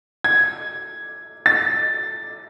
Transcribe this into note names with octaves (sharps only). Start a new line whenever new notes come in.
G#6
A6